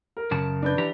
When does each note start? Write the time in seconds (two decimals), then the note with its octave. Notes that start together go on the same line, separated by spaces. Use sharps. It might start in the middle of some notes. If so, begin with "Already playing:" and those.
0.17 A#4
0.31 F#2 C#3 A5
0.62 D4 B4 G6
0.78 E3 G4 A#5